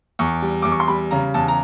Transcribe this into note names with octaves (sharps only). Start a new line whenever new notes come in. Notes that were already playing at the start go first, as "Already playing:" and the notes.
E2 C#6
G3
E2 D6
C#6
C6
G3 B5
C#3 A#5
E2 A5
A#5